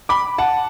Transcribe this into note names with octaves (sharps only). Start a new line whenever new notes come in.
B5 D6
F#5 A5